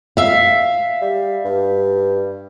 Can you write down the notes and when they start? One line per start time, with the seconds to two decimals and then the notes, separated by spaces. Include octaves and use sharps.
0.17 E5 F5
1.01 G3
1.45 G2